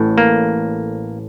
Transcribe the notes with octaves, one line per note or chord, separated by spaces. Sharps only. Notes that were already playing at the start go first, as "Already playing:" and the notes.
Already playing: A1 A2
A#3